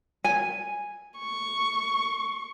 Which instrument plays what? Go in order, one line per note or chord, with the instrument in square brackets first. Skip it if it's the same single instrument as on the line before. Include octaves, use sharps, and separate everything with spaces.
[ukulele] G#5
[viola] C#6